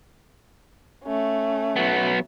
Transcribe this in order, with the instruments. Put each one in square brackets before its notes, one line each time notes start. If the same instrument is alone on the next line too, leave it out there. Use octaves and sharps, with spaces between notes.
[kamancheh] A3 C#4
[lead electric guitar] F#3 B3